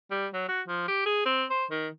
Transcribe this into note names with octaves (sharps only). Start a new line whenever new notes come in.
G3
F#3
F#4
F3
G4
G#4
C4
C5
D#3